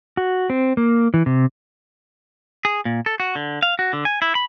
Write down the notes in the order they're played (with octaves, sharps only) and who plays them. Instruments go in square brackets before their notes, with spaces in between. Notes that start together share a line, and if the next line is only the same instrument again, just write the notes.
[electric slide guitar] F#4
C4
A#3
E3
C3
[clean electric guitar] G#4
A#2
A4
F#4
D3
F5
F#4
D3
G#5
E4
B5